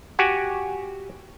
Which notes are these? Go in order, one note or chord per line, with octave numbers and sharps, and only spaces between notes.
F#4 G4 F#5 G#5